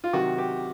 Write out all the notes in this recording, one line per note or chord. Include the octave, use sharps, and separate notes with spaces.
F4
C3 D#3 F#3 F#4
G4